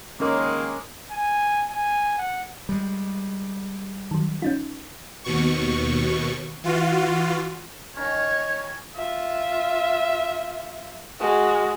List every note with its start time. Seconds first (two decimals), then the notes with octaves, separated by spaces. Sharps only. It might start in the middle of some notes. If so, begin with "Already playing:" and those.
0.20 D#3 G#3 A#3 C#4 A#4
1.11 G#5
1.70 G#5
2.18 F#5
2.69 G3 G#3
4.11 D#3 F#3
4.42 C#4 D#4 F4
5.24 D#2 B2 C#6
6.64 E3 F4 F#4
7.96 D#3 C#4 C#5
8.95 F4 E5
11.19 G#3 F#4